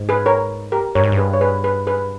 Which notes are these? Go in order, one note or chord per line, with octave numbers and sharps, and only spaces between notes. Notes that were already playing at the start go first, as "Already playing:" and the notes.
Already playing: G#2
G#4 B4
A#4 C#5
G4 A#4
G2 A#4 C#5
G#2
G2
G#4 B4
C#5
G#4 B4
G#4 B4
G#4 B4